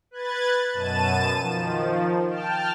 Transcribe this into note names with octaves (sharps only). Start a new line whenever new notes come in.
B4 F#6 G#6 A6
F#2 B2 A5 A6 D#7 E7
D#3 F3
G5 A5 F6